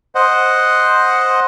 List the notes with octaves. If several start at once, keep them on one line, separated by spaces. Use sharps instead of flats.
C5 D#5 F#5